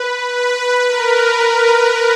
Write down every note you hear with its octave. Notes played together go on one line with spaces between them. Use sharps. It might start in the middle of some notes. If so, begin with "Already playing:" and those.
Already playing: B4
B4
A#4